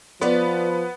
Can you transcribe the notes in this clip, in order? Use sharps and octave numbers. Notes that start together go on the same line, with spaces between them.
F3 B3 F4 B4 D5